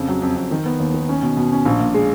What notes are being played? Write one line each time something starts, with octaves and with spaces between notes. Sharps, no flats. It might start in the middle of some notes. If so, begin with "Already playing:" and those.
Already playing: F2 C#3
F#3
F2
F2
D#3
B3
D#2
D#3
C#4
B2
B2
C#4
A#1
A#2
G#3